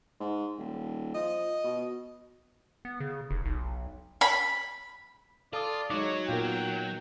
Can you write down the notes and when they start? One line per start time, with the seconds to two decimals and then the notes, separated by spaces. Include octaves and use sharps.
0.20 G#2
0.58 D#1
1.15 F3 D#5
1.64 B2
2.85 B3
3.00 C#3
3.30 F1
3.45 B1
4.21 B5
5.53 F4 A4 D5 A5 D#6
5.90 F#3 G#3 D#4 C#5 D6
6.29 A#2 B3 F4 A#4 G5